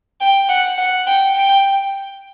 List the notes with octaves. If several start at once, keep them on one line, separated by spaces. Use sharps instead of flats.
G5
F#5
F#5
G5
G5